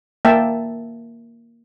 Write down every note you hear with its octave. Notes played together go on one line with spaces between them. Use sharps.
A#3 E5 G5 A5